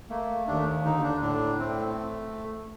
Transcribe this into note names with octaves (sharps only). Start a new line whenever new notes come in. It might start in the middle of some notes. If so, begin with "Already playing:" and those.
A3 A#3
D#2 D4
D3 D#4
D4
A2 D4
A3 C4